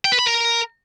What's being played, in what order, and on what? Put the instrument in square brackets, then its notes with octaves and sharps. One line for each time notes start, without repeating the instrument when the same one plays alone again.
[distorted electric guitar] G5
B4
B5
A#4